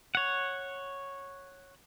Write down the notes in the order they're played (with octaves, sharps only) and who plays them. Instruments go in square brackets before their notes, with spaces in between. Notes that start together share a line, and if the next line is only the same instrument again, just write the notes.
[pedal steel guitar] C#5 F#5